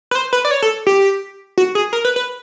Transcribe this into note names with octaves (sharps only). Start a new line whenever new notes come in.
B4
C5
B4
D5
C#5
A4
G4
F#4
G#4
A#4
B4
B4